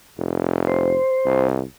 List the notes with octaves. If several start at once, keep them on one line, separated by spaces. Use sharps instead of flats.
F1
C5
C2